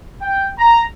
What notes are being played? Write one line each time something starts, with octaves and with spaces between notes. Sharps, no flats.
G5
A#5